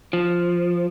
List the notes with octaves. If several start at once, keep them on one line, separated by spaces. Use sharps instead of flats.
F3